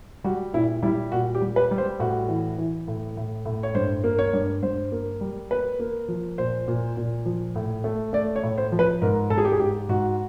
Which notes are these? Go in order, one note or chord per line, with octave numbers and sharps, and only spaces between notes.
G3 F#4
A#2 E4
G3 E4
A#2 F#4
G4
G3
B4
G3
C5
A2 F#4
E3
E3
A2
A2
A2
C#5
G2 C5
A#3
C#5
G2
G2 C5
A#3
G3
A#3 B4
A#3
F3
A#2 C5
A#2
A#2
F3
A2
A3
A3 D5
C#5
A2
C5
F3
B4
G#2 A#4
G#2 A4
G#4
G4
G#4
G#2 G4
G#2 F#4